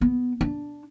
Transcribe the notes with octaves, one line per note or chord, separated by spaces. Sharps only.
B3
D4